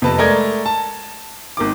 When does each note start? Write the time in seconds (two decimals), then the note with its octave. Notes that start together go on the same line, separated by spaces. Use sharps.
0.02 F2 C3 B4 A5
0.18 G#3 A3 A#4 D5 D#5 G#6
0.66 A5
1.57 G#1 D#3 D6